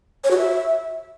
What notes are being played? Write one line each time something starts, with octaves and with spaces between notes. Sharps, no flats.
C#5
F#4
E5